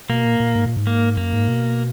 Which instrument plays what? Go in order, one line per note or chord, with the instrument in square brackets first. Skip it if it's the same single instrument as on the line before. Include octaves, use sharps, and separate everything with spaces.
[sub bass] B2 [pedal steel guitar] A#3
[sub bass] A#2
A#2
G#2
A#2
G#2
[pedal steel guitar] A#3
[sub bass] F#2 [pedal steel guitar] A#3
[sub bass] G#2
B2